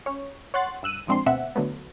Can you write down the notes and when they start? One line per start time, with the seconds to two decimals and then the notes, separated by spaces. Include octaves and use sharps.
0.06 C#4 C#5
0.54 C#5 F#5 C6 F#6 A6
0.83 G2 E6 F#6 D#7
1.07 A#1 F3 G#3 C4 D4 C6
1.26 D2 B2 C4 E5 F#5
1.56 D3 F#3 A3 B3